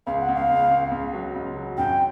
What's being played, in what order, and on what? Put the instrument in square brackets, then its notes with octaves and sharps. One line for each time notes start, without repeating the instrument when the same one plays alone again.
[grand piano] C#2 [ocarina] F5
[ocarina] F#5
[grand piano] C#2
[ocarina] F5
[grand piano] C#2
C#2
C#2
F#3
C#2
F#3
[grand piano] F#2 [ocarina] G5